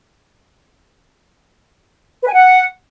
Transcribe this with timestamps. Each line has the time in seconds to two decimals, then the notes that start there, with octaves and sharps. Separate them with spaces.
2.22 B4
2.27 G#5
2.32 F#5